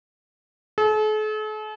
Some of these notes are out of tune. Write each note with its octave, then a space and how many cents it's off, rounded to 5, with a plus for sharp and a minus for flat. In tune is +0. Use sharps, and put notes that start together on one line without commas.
A4 -45